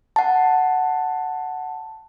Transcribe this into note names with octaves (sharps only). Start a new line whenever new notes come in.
F#5 A5